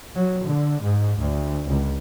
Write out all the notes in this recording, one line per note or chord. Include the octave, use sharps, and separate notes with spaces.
F#3
D3
G#2
D2
C#2